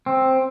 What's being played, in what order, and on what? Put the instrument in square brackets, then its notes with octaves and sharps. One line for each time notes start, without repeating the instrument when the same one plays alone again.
[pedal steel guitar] C4